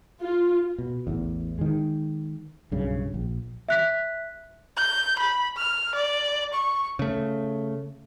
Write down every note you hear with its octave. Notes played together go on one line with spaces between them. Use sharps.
F4
B2
A1 E2
D#3 G#3
B1 G2 C#3
A#1
E5 F#6 B6
G6
B5
F6
D5
C#6
C#3 A3